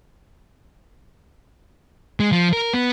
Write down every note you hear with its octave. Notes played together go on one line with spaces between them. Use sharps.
G#3
F3
A#4
B3